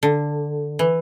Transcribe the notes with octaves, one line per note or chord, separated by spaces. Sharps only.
D3
E3